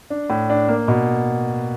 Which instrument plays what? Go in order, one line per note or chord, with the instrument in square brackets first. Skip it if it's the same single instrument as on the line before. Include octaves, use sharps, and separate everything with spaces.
[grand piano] D4
A2
D4
A#3
B2